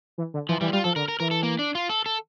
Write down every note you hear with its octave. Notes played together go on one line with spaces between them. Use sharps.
E3
D3
E3 F3
E3 G3
E4
G3 F4
F3 A4
D3 A#4
A#4
E3 A#4
A4
A#3
D4
F4
A4
A4